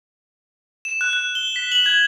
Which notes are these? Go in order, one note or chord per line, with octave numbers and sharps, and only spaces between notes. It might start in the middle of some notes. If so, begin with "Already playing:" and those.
E7
F#6
F#6
G7
B6
F#7
G#6